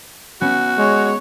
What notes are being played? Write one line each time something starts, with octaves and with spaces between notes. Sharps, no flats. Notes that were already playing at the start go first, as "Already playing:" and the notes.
B3 C#4 F#4
G#3 C#5